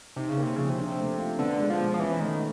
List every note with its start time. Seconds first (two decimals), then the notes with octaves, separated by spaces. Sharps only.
0.16 C3 D#4
0.29 C#3
0.37 A#3
0.42 C3
0.56 C#3 F3
0.70 C3
0.78 D4
0.98 A3
1.19 F4
1.39 D3 B3
1.59 G#3
1.70 F3
1.80 B2
1.94 F3
2.00 E3 C#4
2.20 D#3 A3